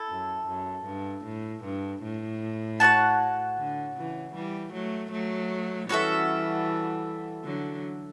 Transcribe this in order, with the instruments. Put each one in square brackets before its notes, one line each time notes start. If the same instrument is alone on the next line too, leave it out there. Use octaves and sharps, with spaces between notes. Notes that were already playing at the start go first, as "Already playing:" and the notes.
Already playing: [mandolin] E4 A4
[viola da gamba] F#2
F#2
G2
A2
G2
A2
[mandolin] F#4 C#5 F#5 A5
[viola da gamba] D3
C#3 E3
E3 G3
F#3 A3
F#3 A3
[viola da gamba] E3 G3 [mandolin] C#4 F#4 A4 E5
[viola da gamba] D3 F#3